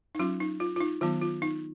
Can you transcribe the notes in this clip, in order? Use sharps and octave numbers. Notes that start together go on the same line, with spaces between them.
D#4
F#3 C#4 F4
D#4
F4
F4
D#4
D#3 F#3 B3 F4
F4
D#4